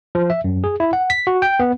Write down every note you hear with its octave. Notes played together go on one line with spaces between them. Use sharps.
F3
E5
F#2
G#4
E4
F#5
B6
F#4
G5
B3